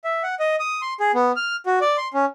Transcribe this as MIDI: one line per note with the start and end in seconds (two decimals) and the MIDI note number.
0.04 0.22 76
0.23 0.35 78
0.40 0.56 75
0.60 0.81 87
0.82 0.94 84
1.00 1.11 68
1.14 1.32 59
1.36 1.56 89
1.66 1.79 66
1.81 1.97 74
1.98 2.08 84
2.14 2.25 61